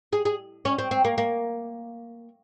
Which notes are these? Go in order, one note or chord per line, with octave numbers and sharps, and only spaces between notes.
G#4
G#4
C#4
C4
C4
A#3
A#3